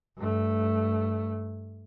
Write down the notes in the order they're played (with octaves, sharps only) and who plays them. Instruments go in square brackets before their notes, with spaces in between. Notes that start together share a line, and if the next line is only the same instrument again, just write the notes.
[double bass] G2 A3